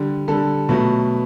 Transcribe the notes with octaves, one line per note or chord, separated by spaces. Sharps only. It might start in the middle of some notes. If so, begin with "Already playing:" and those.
Already playing: D3 G3
D3 G3 A4
B2 F#3 A3 B4